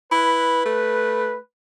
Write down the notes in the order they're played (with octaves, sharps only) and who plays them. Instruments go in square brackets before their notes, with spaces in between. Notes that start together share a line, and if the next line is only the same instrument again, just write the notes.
[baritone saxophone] E4 [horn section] B4
[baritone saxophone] A3